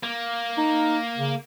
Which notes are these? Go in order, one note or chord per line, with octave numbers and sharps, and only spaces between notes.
A#3
D#4
C#3